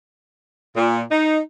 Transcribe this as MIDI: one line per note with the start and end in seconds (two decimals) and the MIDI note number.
0.76 1.01 46
1.10 1.40 63